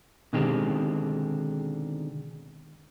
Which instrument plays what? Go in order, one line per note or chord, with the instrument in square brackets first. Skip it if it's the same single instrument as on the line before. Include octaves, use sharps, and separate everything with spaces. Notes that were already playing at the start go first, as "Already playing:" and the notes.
[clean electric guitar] B2 D3 D#3 G#3 C4 G4